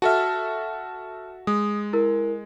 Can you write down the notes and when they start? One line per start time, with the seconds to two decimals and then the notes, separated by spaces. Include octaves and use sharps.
0.02 F#4 A4 E5 A5 F6
1.47 G#3 D#6
1.93 E4 A#4